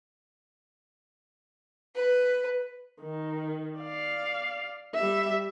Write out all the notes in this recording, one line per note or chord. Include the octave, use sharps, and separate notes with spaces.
B4
D#3
D5 F5
G3 E5